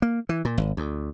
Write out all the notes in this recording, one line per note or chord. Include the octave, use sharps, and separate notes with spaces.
A#3
E3
A#2
G#1
D2